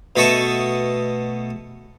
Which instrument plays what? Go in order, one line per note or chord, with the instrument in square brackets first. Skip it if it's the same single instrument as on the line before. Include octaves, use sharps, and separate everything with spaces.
[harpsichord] B2 A3 A4 D#5 A5 C#6